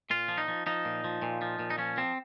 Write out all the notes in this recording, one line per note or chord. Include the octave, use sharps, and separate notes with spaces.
A#2 F4
F3
D#4
F3
F3 D#4
A#2
F3
A#2
F3
A#2
D#4
F3 C#4
F3 C4